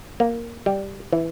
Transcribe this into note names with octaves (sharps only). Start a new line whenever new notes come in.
A#3
G3
E3